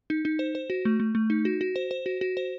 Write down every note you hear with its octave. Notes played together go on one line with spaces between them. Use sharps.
D#4
D#4
C5
C5
F#4
A3
A3
A3
D#4
F#4
F#4
C5
C5
F#4
F#4
C5